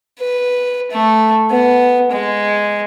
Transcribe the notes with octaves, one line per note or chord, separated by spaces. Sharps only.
B4
A3
B3
G#3